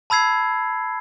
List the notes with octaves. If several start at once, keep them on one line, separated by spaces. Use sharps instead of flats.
A5 B5 E6 G#6 C7